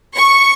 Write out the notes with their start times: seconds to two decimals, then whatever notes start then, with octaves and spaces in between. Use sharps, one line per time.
0.18 C#6